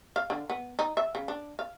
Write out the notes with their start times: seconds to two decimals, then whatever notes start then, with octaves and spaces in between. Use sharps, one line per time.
0.16 F5
0.30 D3
0.50 B3
0.79 D#4
0.97 E5
1.15 C#3
1.28 D4
1.59 F5